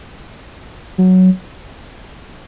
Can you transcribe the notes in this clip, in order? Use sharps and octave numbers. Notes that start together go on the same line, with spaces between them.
F#3